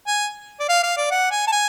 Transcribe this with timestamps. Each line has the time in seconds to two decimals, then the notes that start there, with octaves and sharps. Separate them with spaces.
0.07 G#5
0.60 D5
0.69 F5
0.83 F5
0.97 D5
1.11 F#5
1.31 G#5
1.47 A5
1.52 G#5